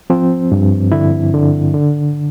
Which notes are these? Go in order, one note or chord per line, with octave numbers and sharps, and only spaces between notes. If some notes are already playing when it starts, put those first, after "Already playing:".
F3 C4
G2
D3 E4
D3
D3